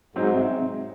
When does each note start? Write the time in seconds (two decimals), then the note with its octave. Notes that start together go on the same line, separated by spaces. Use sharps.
0.15 G#2 F#3 C4 D#4
0.31 C3